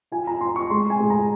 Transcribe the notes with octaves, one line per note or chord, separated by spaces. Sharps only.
F4 G#5
A#5
F4 C6
C#6
G#3 C6
G#5
G#3
A#5